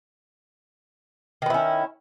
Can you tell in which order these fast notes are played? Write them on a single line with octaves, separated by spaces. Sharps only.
D#3 B3 E4 C#4